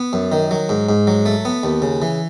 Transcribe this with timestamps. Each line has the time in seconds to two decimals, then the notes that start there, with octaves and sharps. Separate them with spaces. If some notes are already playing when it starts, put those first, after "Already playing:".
Already playing: B3
0.13 F#2
0.32 D#3
0.51 F#3
0.69 G#2
0.89 G#2
1.07 F#3
1.26 A3
1.45 B3
1.63 D#2
1.82 C#3
2.02 E3